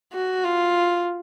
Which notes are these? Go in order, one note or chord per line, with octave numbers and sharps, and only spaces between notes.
F#4
F4